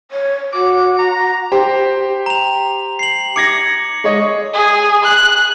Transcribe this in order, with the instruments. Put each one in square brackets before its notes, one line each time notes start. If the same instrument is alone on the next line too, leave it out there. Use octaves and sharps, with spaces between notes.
[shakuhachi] C#5
[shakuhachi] F#4 [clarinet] D6
[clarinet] A#5
[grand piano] G4 C5
[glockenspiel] A#5 F7
C7 F#7
[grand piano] D6 G#6 A#6 [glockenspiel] C#7
[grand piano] G#3 C#5 D#5
[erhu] G#4
F#6